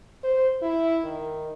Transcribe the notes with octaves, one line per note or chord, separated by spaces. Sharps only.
C5
E4
D#3